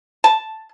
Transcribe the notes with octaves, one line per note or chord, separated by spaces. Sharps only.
A5